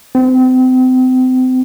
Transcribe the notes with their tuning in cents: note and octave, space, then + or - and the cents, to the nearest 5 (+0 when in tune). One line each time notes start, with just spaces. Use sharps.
C4 -35